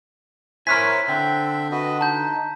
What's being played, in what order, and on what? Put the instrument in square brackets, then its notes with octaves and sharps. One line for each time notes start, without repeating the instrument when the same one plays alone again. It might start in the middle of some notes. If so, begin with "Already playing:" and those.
[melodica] E4 C5 [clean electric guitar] A#4 C#5 G#5 [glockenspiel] F6 F#6 B6
[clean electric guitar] D3 [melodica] C4 E5 G5
[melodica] F#4 B4 D#5
[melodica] D#4 [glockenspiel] A5 G6